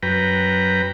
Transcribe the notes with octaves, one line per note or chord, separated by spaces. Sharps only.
F#2 B4 G5 A#5